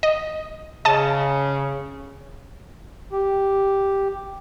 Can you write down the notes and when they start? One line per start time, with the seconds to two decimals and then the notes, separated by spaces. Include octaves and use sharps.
0.03 D#5
0.85 C#3 D#5 A5
3.12 G4